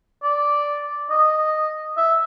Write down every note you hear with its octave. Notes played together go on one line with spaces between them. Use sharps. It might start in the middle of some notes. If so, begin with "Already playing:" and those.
D5
D#5
E5